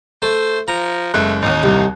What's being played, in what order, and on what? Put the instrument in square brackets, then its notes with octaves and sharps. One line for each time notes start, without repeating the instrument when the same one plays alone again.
[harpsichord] A3 [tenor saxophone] C5
[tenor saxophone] F3 [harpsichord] A#5
[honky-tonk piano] F#1 G#3 F#6 [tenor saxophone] A3
[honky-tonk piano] A1 D#2 [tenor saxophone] D#4
[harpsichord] C2